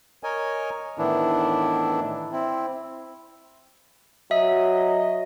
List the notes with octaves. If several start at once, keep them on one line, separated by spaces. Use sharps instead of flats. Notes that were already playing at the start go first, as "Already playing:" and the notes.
A#4 C#5 D#5 G#5
A2 D#3 E3 B3 D4 E4
C4 E4
F#3 D#5 E5